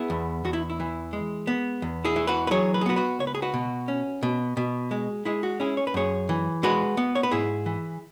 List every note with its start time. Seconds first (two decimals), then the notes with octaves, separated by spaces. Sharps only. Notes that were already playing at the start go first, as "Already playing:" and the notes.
Already playing: B3 E4 G#4
0.10 E2
0.45 E2 F#4
0.53 E4
0.70 E4
0.80 E3
1.13 G#3
1.47 B3
1.82 E2
2.05 E4 G#4
2.16 E3
2.27 F#4 B4
2.47 B4
2.51 F#3 G#4 C#5
2.74 B4
2.81 G#4
2.86 B3 F#4 B4
2.96 F#4 B4
3.19 C#2 C#5
3.27 B4
3.35 G#4
3.42 F#4 B4
3.54 B2
3.88 C#4
4.23 B2
4.57 B2
4.91 G#3
5.25 G#3 E4 G#4
5.43 F#4
5.60 C#4 E4 G#4
5.77 C#5
5.87 B4
5.94 F#2 G#4 C#5
6.29 E3
6.63 G#3 F#4 B4
6.97 B3
7.15 C#5
7.23 B4
7.31 G#2 E4 G#4
7.66 E3